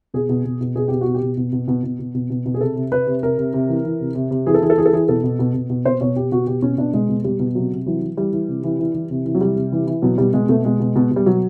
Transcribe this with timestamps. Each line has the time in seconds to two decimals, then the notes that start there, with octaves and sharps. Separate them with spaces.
0.14 B2 G#4
0.29 B2
0.44 B2
0.61 B2
0.75 B2 G#4
0.88 B2 G4
1.01 F#4
1.07 B2
1.15 G4
1.22 B2
1.37 B2
1.53 B2
1.68 B2
1.83 B2
1.99 B2
2.14 B2
2.30 B2
2.46 B2
2.54 G#4
2.61 C3 A4
2.76 C3
2.92 C3 B4
3.07 C3
3.23 C3 A#4
3.38 C3
3.53 C3
3.69 E3
3.85 E3
4.00 C3
4.15 C3
4.31 C3
4.47 E3 G#4
4.54 A4
4.62 E3 G#4
4.70 A4
4.78 E3 G#4
4.86 A4
4.93 E3 G#4
5.08 B2 A4
5.24 B2
5.39 B2
5.54 B2
5.70 B2
5.85 B2 C5
6.01 B2 C#5
6.16 B2 G4
6.32 B2 F#4
6.47 B2 G4
6.62 B2 C#4
6.78 B2 D4
6.94 B2 G#3
7.09 B2
7.24 B2 G3
7.39 B2
7.55 C3 F#3
7.71 C3
7.86 E3 F#3
8.02 E3
8.17 E3 G3
8.33 E3
8.48 C3
8.64 E3
8.79 E3
8.94 E3
9.10 C3
9.25 E3
9.35 F#3
9.41 C3 G3
9.56 C3
9.72 E3
9.87 E3
10.02 B2 F#3
10.18 B2 G3
10.34 B2 G#3
10.49 B2 A3
10.65 B2 G#3
10.80 B2
10.95 B2
11.11 B2
11.16 G3
11.26 B2 F#3